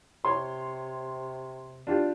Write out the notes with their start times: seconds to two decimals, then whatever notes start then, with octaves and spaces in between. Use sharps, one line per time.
0.25 C3 C#5 C6
1.87 D4 F4 G4